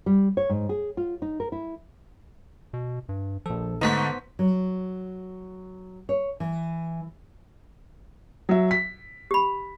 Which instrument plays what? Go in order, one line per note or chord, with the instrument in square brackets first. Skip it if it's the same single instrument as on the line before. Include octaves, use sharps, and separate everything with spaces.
[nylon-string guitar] G3
C#5
G#2
G#4
F4
D#4
A#4
E4
[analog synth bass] B2
G2
[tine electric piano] A#1 A4 [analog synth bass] F3
[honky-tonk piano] G#2 A3 D#4 [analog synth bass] D3 [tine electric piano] B3 C5 B6
[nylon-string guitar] F#3
C#5
E3
[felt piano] F#3 E5
B6
[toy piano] G4 B5